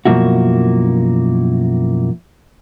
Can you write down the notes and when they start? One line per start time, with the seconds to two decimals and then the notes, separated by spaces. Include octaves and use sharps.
0.05 F#2 B2 F3 A#3 E4 F#4